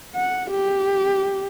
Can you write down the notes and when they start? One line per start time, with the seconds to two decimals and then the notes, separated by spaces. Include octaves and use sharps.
0.16 F#5
0.51 G4